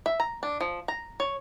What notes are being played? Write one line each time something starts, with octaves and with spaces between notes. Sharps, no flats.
E5
A#5
D4
F3
A#5
C#5